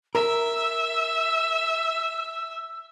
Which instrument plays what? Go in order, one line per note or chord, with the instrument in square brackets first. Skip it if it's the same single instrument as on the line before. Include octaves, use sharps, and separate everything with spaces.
[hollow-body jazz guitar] A#4 [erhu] E5 [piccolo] E6